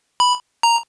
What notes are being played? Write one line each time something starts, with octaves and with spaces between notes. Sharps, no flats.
B5
A#5